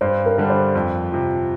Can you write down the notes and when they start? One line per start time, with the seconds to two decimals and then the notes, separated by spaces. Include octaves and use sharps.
0.01 G2 C5
0.26 A#4
0.38 D3 G3 D4
0.50 C5
0.75 F2
1.12 C3 F3